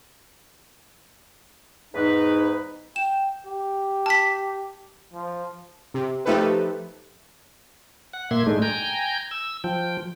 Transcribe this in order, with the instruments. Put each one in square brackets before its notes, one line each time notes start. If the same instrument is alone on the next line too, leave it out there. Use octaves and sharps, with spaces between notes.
[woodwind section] E2 G#2 B4 [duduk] D#4
[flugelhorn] G5 [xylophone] E7
[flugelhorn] G4
[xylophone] A5 B6
[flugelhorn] F3
[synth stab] C3
F3 A3 D#4 G4 A4 B4
[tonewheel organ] F#5
A#2 A#3 E5 C6 G#6
A2 G#3 A3 D4 D#4
G5 G#5 A#5 G6
E6
F3 G5